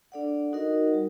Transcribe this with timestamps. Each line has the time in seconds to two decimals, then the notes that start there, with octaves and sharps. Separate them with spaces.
0.12 D4 A4 D5 F#5
0.53 D#4 F#4 A#4 D#5 F#5
0.94 G3